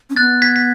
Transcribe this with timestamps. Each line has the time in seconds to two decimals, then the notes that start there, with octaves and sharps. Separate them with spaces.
0.10 C#4
0.16 B3 F#6 A6
0.42 G#6 B6
0.56 B6